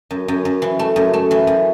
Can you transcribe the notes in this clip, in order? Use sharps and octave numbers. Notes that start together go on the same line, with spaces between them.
F#2
F#2
F#2
E3
A3
F#2
A3
E3
F#2